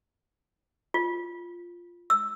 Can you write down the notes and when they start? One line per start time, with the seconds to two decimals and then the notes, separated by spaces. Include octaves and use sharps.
0.94 F4
2.10 E6